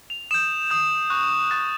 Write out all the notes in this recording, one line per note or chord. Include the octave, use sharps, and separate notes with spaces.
F7
D#6 G6 E7
D#6 G6
C#6 F#6
C#6 F#6 A6